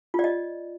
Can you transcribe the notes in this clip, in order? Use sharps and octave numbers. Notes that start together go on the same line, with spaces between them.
F4
D5
D#5